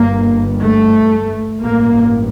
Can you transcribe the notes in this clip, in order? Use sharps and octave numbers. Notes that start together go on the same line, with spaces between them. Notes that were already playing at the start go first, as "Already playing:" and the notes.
Already playing: G1 G2 A#3
A3
A1 G2 A#3